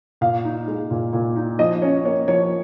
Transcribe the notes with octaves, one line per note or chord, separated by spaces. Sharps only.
A#2 F5
D#4
G#3
A#2
A#2
D#4
F3 D#5
C#4 C#5
A#3 C#5
F3 C#5